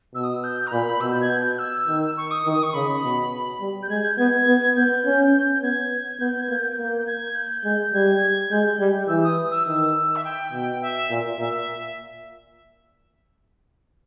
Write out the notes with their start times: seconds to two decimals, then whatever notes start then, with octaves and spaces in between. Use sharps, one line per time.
0.15 B2 E6
0.24 D#6
0.34 E6
0.44 G6
0.67 A#5
0.72 A#2 B5
1.01 B2 E6
1.11 G6
1.21 G#6
1.30 G6
1.59 E6
1.88 D#3
2.17 C#6
2.31 D#6
2.45 D#3
2.52 D#6
2.63 C#6
2.74 C#3 B5
3.03 B2
3.61 G3
3.83 G6
3.90 G#3 G#6
4.04 G6
4.18 B3 G#6
4.47 B3
4.76 B3 G6
5.05 C#4
5.55 G6
5.62 B3 G#6
6.09 G#6
6.20 B3 G6
6.42 G#6
6.49 A#3 G6
6.78 A#3
6.99 G6
7.07 G#6
7.35 G6
7.65 G#3
7.93 G3 G#6
8.51 G#3 G6
8.80 G3
9.08 E3 E6
9.24 D#6
9.51 E6
9.67 D#3 E6
10.16 E5
10.24 G5
10.52 B2
10.82 E5
11.10 A#2
11.39 A#2 E5